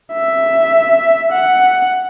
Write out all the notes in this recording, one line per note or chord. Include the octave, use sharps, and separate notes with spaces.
E5
F#5